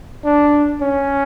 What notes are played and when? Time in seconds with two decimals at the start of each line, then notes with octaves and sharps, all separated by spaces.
0.25 D4
0.82 C#4